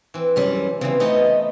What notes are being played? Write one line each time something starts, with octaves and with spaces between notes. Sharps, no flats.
E3 C4
F#2 G3 C#4
E2 C#3 E3 C4
A3 B3 D#4 D#5